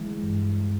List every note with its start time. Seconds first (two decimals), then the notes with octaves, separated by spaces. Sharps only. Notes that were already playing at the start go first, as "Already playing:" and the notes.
Already playing: E3 G#3
0.23 G2